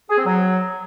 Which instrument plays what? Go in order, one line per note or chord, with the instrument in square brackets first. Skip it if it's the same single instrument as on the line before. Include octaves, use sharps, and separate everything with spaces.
[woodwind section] G#4
C4
F#3